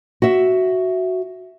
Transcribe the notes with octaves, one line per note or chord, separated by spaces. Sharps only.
F#4 E5